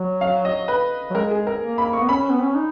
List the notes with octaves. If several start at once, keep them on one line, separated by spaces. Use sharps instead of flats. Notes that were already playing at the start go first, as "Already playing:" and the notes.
Already playing: F#3
F5
D#5
B4
F#3
G#3 A#4
G#4
A#4
A#3
B5
C#6
B3
C#4 B5
B3
C#4
D#4